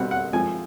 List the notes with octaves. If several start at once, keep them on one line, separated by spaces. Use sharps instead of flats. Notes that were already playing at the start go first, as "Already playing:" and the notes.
Already playing: B2 G3 C4 F#5
F#5
F3 G#3 C4 G#5